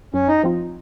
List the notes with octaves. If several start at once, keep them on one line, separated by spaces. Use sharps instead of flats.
F#2 C#4
D#4
F3 C4 F4